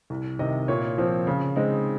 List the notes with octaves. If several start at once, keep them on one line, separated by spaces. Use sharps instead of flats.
C2
C3 D#3 D#5
A#2 C#5
F3 C4
C#3
G#3 C4 D#4